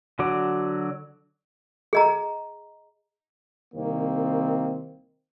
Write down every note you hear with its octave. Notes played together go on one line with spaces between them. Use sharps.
D3 F#3 F#4 D5
G#4 D#5 A#5
C2 D#3 A#3 C4